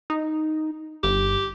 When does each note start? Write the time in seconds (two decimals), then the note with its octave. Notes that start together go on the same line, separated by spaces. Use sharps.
0.10 D#4
1.03 G1 G4